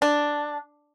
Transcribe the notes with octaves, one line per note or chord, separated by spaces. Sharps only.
D4